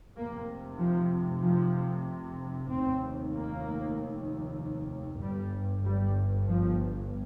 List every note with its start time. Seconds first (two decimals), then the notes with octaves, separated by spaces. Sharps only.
0.16 F1 F2 C3 A#3
0.79 F3
1.43 F3
2.69 F1 D#2 C4
3.32 A#3
5.21 G1 G2 G3
5.85 G3
6.48 F3